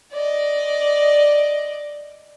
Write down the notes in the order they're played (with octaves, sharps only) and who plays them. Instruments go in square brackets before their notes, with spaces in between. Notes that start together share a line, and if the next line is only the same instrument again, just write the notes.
[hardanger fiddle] D5 D#5